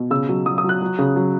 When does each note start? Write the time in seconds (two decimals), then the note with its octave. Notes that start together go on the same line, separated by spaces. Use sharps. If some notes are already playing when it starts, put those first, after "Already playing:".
Already playing: B2
0.10 C#3 E6
0.29 F#3
0.46 F#3 D#6
0.58 D#6
0.64 F#3
0.69 F#6
0.82 F#3
0.99 C#3
1.16 F#3